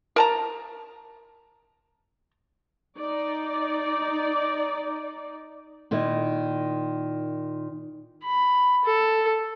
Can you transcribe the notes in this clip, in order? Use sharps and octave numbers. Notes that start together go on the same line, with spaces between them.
A#4 A5 A#5
D#4 D5
A#2 D#3 E4
B5
A4